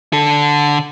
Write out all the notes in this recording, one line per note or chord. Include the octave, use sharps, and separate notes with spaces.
D3 A4